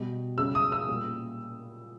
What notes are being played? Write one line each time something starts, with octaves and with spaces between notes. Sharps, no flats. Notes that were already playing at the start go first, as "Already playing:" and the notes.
Already playing: B2 G3
C#3 G3 E6
D#6
E6
A#2 G3